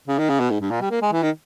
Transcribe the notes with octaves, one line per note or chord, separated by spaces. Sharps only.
C#3
D#3
C#3
B2
G#2
G2
A#2
G3
A#3
G#3
E3
D#3